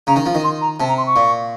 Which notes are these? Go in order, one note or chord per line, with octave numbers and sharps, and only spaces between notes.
C#3 A#5
D#3
F3
D#3
C6
A#5
C3 A5
A#5
C6
C#6
A#2